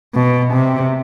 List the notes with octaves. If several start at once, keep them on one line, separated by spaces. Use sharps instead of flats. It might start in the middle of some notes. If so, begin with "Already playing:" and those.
B2
C3